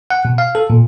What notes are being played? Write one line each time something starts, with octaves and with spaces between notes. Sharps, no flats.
F#5
B2
F5
A4
A#2